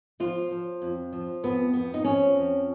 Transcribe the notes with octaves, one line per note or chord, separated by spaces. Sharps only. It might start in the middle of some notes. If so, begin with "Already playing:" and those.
F3 F4
F3
F2
F3
F2 B3
F2 B3
D#4
F3 C#4
F2